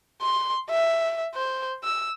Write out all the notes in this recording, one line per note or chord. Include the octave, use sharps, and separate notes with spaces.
C6
E5
C5
E6